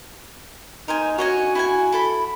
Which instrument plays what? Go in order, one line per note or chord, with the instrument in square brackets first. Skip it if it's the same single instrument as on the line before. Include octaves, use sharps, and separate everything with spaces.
[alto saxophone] D#4 [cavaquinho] A#4 C5 G#5
[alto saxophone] F#4 [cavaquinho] C#5 D#5 G#5
[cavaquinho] E4 G5 G#5
E4 A4 B5